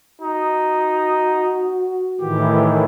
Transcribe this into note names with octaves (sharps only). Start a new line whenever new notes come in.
D#4 F#4
A2 D#3 E3 G4